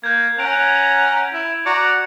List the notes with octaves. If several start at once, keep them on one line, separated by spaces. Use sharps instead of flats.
A#3 G6 G#6
C#4 F#5 A#5 D7 F7
E4
F#4 D5 A#5 C#7